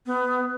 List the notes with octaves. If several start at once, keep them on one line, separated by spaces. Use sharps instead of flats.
B3